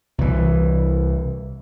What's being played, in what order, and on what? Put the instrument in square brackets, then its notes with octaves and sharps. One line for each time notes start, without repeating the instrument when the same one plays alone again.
[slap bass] C2 E3